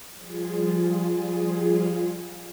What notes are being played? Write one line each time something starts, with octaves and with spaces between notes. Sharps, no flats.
F3 G3 F4 G#4